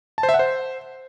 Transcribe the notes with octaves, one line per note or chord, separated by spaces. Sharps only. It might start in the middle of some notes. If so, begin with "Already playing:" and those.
A5
C5
E5
F#5
C5